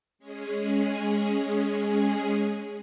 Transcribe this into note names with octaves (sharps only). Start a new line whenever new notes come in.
G#3 C#4 G#4